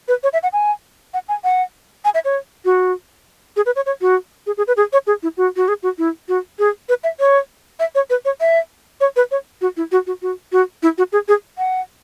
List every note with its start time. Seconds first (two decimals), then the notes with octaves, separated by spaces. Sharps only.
0.08 B4
0.23 C#5
0.33 E5
0.43 F#5
0.53 G#5
1.14 F#5
1.29 G#5
1.44 F#5
2.05 G#5
2.14 E5
2.25 C#5
2.65 F#4
3.56 G#4
3.66 B4
3.76 C#5
3.86 C#5
4.01 F#4
4.47 G#4
4.57 G#4
4.67 B4
4.77 G#4
4.93 C#5
5.07 G#4
5.23 E4
5.37 F#4
5.56 F#4
5.68 G#4
5.83 F#4
5.98 E4
6.28 F#4
6.59 G#4
6.89 B4
7.04 E5
7.20 C#5
7.80 E5
7.95 C#5
8.10 B4
8.25 C#5
8.40 E5
9.01 C#5
9.16 B4
9.31 C#5
9.61 F#4
9.77 E4
9.92 F#4
10.07 F#4
10.22 F#4
10.52 F#4
10.83 E4
10.98 F#4
11.12 G#4
11.28 G#4
11.58 F#5